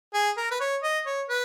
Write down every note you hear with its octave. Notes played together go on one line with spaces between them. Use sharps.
G#4
A#4
B4
C#5
D#5
C#5
B4